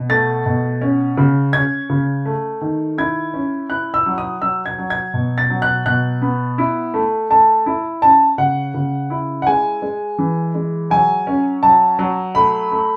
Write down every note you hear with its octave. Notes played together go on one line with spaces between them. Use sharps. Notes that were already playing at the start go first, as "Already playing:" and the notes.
Already playing: B2
A3 A6
B2
C#4
C#3
C#4 G#6
C#3
A3
D#3
E4 G#6
C#4
E4 F#6
E6
F#3
D#6
F#3 E6
G#6
F#3
G#6
B2
A6
F#3
F#6
B2 F#6
B3
E4
A3
A3 A5
E4
C#4 A5
C#3 F#5
C#3
E4
F#5
G#3 G#5
G#3
E3
G#3
F#3 G#5
C#4
F#3 A5
F#3
A3 B5
A3